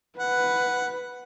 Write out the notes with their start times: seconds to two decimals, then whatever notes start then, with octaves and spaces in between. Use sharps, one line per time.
0.19 B4 F#5